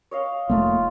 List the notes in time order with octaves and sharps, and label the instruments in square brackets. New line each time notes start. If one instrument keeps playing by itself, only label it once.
[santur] C#5 D#5 F5
[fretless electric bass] F1 A3 A#3 [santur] D#4 [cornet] F4